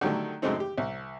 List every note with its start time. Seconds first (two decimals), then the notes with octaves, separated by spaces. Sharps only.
0.01 D3 D#3 F#3 G3 A3
0.42 F#2 C#3 G#3 A3 C4 D#4
0.60 G4
0.78 C2